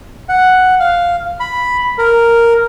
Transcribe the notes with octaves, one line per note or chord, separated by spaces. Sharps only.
F#5
F5
B5
A#4